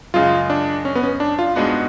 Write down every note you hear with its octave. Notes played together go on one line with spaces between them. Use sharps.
F#2 C#3 G#3 F4
D4
C#4
B3
C#4
D4
F4
G#2 G#3 B3 D4 F#4